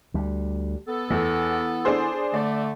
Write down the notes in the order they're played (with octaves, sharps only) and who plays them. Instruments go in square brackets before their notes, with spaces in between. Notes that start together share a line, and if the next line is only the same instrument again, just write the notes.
[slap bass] D2 G3
[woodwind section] B3 A4
[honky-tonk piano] E2 [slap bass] E3
[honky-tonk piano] D4 G#4 C5
[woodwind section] D3 A3 [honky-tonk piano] D5